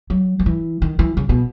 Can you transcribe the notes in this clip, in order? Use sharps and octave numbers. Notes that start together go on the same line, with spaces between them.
F#3
F#3
E3
D#3
E3
C#3
B2